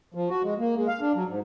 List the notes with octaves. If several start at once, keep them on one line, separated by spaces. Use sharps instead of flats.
F3
F#4
G#3
A#3
G#3
F5
D4
F#3
G#2